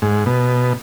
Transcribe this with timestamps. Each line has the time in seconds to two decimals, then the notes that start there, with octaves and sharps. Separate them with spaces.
0.02 G#2
0.26 B2